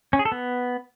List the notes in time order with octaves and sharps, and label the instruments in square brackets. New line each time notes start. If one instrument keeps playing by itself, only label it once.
[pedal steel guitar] C#4
G#4
A4
B3